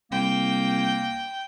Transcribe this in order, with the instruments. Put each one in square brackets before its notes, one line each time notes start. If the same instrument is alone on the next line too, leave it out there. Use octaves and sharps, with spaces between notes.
[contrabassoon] C2 [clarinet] A#3 [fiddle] G5